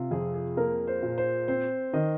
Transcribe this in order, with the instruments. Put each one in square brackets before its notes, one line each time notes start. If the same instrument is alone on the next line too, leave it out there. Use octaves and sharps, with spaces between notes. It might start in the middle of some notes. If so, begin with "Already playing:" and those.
Already playing: [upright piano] C3 [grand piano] F4
[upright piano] F2 [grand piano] G#4
[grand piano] G#4
[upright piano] A#3 [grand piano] A#4
[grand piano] C5
[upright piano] A#2
[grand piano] C5
[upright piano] C4 [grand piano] C5
[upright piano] D#3 [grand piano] D#5